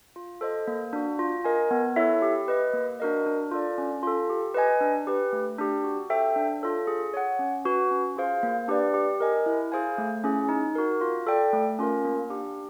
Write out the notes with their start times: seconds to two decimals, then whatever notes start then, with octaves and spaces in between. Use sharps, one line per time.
0.16 F4
0.41 A4 C5 D#5
0.67 A#3
0.93 D4 F#4
1.19 F4
1.44 A#4 D#5 G#5
1.71 B3
1.96 E4 A4 C#5 E5
2.22 G4
2.48 B4 D#5
2.73 A#3
3.00 D4 F#4 A#4 D#5
3.26 D4
3.51 F4 A4 D5
3.78 C#4
4.03 F4 A4
4.30 G4
4.54 B4 D#5 G#5
4.81 D4
5.07 G4 B4
5.33 A3
5.58 D4 G4
5.84 F#4
6.10 A4 C5 E5 G5
6.36 D4
6.62 F4 A4 C#5
6.87 G#4
7.14 C#5 F#5
7.39 C#4
7.65 F#4 B4
7.91 C#4
8.16 F4 G#4 C5 F5
8.43 A#3
8.68 D4 G4 B4 D5
8.94 G4
9.20 A#4 D#5 G#5
9.46 E4
9.72 G#4 C5 F5 G#5
9.98 A3
10.24 C#4 E4 G#4
10.49 D#4
10.75 F#4 A#4
11.01 F4
11.27 A4 D5 G5
11.53 A3
11.79 C#4 F4 A#4
12.04 A#3
12.30 D4 G4